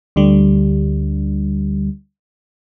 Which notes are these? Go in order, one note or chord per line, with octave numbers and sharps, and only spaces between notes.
D2 D3 G3